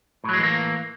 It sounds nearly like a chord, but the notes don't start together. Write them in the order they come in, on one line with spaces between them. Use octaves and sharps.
A2 F#3 G#3 E3 A#3